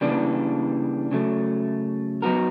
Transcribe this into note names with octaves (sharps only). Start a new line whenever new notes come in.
C#3 E3 G3 A#3 D4
C#3 F#3 A3
F#3 B3 D#4 F#4 A#4